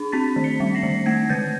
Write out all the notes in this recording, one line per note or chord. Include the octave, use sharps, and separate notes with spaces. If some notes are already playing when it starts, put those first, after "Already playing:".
Already playing: D4
C4 A6 B6
D#3
B6 C#7
G3
A#6 C7
D#3
A3 G#6 A#6
D3 G6 A6